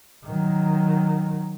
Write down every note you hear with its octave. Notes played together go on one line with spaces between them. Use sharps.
D#3 F#3